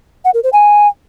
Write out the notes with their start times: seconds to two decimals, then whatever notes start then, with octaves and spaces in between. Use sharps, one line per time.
0.25 F#5
0.34 A#4
0.43 C5
0.53 G#5